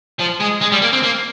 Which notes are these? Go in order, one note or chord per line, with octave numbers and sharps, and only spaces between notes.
F3
G#3
G#3
G3
A#3
C4
A#3